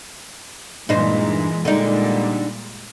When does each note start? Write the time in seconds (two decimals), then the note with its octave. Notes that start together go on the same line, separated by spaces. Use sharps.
0.89 G2 A#2 E3 G#3 D#4 C5
1.65 A#2 D3 G3 G#3 D#4